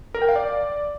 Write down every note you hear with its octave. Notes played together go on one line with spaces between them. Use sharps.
A#4
G5
F5
D5